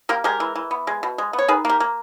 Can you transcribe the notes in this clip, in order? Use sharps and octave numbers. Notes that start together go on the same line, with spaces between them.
A#3 G4 A#4
G#3 G4 A#4
E3
E3
B3
G#3
B2
G#3
B3
C#5
D#3 G#4 B4
A#3 G4 A#4
A#3